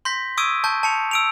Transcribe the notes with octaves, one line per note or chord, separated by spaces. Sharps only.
C6 G6 A#6 B6
C#6 D#6 E6 G#6 D7 D#7
A5 C#6 G6
A5 C#7 F7
E6 D7 F7